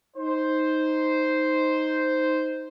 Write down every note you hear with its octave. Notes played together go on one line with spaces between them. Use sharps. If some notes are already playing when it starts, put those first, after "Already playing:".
D#4 C5